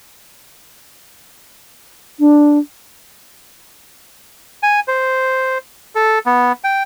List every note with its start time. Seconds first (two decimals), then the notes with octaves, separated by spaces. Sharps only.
2.19 D4
4.63 G#5
4.88 C5
5.95 A4
6.26 B3
6.64 G5